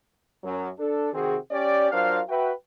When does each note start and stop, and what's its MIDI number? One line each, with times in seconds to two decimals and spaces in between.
0.44 0.70 42
0.44 0.70 54
0.79 1.10 62
0.79 1.10 69
1.13 1.36 48
1.13 1.36 51
1.13 1.36 60
1.13 1.36 66
1.13 1.36 68
1.51 1.91 61
1.51 1.91 67
1.51 1.91 74
1.91 2.20 54
1.91 2.20 62
1.91 2.20 65
1.91 2.20 70
1.91 2.20 72
1.91 2.20 77
2.29 2.52 66
2.29 2.52 71
2.29 2.52 76
2.29 2.52 79